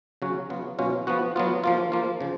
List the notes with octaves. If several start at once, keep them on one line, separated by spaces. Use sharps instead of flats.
C#3 F#3 C#4 F#4
C#3 F#3 B3 F4
B2 F#3 C#4 F4
F3 B3 F#4
F#3 B3 F4
F3 A#3 F4
F3 A#3 F4
C#3 F3